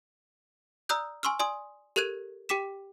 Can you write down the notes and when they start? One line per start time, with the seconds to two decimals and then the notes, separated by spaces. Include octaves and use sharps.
0.89 D5 A#5 D#6 E6 F#6 G6
1.23 G#5 C6 C#6 E6 F6
1.39 D5 G#5 C6 D#6
1.96 G4 A4 A#4 F#6 G#6 D#7
2.49 G4 G5 D6 B6 E7